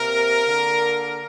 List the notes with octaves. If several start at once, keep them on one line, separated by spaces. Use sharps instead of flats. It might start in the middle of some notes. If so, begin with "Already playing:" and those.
Already playing: C3 A#3 A#4
D3 A#3